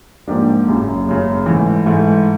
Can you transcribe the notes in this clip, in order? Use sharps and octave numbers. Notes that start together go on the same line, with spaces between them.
G#2 F3 A#3 D4 G4
F#1 F#2 C#3
F#1 F#2 C#3
G#2 E3 A3
G#2 E3 A3